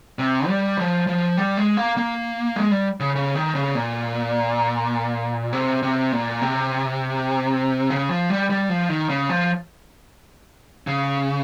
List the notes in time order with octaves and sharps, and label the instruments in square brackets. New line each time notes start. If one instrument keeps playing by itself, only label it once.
[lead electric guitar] C3
G3
F3
F3
G3
G#3
A#3
A#3
G#3
G3
C#3
C#3
D#3
C#3
A#2
C3
C3
A#2
C3
C#3
F3
G3
G3
F3
D#3
C#3
F3
C#3